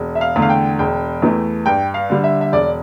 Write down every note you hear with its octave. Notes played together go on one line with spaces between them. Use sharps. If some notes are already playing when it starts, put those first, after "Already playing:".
Already playing: E1
E5
F5
E2 D3 A3
F5
G5
E1 G5
E2 E3 A3
G2 G5
F5
D3 G3
E5
E5
E1 D5